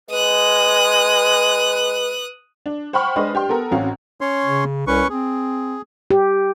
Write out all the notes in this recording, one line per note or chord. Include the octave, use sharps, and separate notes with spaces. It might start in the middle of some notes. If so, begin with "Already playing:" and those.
G#3 B4 D#6 F#6
D4
C5 F#5 G5 B5 C#6 F6
G#3 D4 B4 C5 D#5
D4 G4 G5 C6
B3 A4 A#4
A1 C4 C#4 F#4 F5 A#5
C#4 C#5 C6
C#3
C2 C#4 B4 C#6
C4 G#4
G4